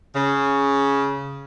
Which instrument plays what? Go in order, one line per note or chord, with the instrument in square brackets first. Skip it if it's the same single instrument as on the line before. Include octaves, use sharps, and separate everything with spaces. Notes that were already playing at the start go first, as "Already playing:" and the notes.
[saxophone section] C#3